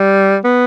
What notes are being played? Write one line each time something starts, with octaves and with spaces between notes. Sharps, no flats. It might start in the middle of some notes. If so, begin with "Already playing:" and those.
Already playing: G3
B3